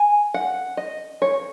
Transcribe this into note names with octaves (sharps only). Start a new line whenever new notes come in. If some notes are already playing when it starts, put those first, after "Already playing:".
Already playing: G#5
F#5
D#5
C#5